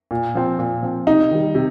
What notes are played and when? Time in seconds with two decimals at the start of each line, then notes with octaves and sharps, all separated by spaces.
0.11 A#2
0.35 F3 C4
0.59 A#2
0.83 F3 C4
1.07 C3 D#4
1.31 D#3 G3
1.55 C3